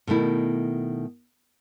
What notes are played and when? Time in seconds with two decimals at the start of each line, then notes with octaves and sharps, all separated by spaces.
0.07 B2 D#3 A3 E4